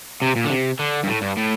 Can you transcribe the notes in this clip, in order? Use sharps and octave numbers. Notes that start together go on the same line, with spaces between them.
C3
A#2
D3
C3
D3
G2
A2
G2
A2